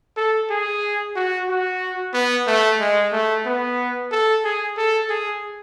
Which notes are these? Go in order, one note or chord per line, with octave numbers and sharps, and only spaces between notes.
A4
G#4
F#4
F#4
B3
A3
G#3
A3
B3
A4
G#4
A4
G#4